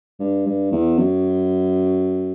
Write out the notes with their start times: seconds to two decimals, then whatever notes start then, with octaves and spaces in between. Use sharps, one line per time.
0.20 G2
0.47 G2
0.72 E2
0.99 F#2